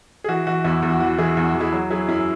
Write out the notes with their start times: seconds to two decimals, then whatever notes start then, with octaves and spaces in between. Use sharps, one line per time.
0.24 G#4
0.28 E3 F#4
0.47 E3 F#4
0.64 E2 E4
0.82 E2
0.89 F#4
1.00 E3 F#4
1.18 E3 E4 G#4
1.36 E2 F#4
1.49 F#4
1.55 E2
1.60 E4 G#4
1.72 F#3 F#4
1.90 F#3 E4 G#4
2.08 F#2 E4